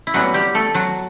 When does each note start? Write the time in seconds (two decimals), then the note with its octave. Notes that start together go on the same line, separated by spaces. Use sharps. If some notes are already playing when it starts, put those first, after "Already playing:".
0.07 E4
0.14 A2 E3 F#3 G3 B3 F#4
0.34 G3 G4
0.55 A3 A4
0.74 F#3 F#4